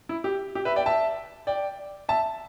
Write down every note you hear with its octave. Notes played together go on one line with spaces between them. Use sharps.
E4
G4
G4
B4 E5
D5 G5
E5 A5
D5 G5
E5 A5